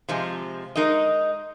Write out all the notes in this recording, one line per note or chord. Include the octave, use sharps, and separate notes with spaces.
C3 F3 G#3
G#3 D#4 A#4 D#5